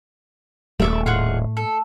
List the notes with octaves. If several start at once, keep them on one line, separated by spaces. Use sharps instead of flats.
D#1 A3 D5 E5 D6
A2 F4 G#4 F#5
A4